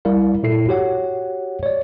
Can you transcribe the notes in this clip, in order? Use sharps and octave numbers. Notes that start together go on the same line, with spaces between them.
G3 E4 A#4 D5 F5
A#2 E4 A4 C7
F#4 G4 C#5 F#5
C#5 D5